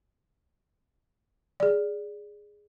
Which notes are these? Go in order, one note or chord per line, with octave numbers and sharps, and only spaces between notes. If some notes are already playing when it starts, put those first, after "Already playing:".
G#4 D5